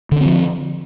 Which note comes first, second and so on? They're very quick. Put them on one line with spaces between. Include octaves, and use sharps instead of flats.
D3 C#4 C4 F3